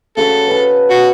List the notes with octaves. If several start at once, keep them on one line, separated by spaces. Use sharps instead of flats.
C#3 F#4 A4 B5
B4 A5
F#4